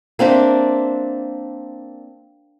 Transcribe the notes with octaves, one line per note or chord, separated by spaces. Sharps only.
A#3 C4 D4 E5